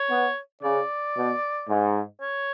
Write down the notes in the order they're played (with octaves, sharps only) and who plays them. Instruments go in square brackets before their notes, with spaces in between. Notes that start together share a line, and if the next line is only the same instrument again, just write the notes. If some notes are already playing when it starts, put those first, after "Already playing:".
Already playing: [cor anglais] C#5
[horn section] B3
[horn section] C#3 [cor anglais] D5
[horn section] B2
G#2
[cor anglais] C#5